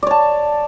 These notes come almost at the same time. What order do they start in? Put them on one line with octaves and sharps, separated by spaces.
D5 C#5 A5